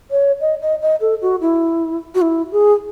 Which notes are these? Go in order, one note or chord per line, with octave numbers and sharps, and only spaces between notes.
C#5
D#5
D#5
D#5
A4
F#4
E4
F#4
E4
G#4